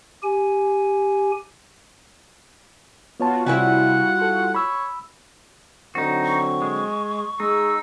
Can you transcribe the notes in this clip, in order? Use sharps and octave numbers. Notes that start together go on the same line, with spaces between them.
G4 G#5
B3 F4 F#4 C#5 A5
C3 G3 E4 C#5 F#5 G#5
A4
C#5 B5 E6
D3 F#3 C4 D#4 F#4
C#6
G#3
G#3 D#4 E6